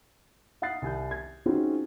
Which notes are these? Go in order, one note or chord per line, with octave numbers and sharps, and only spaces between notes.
F5 F#5 D#6 F#6 A6 C7
C2 G#5 G6
G#6
C4 C#4 D#4 F4 F#4 G#4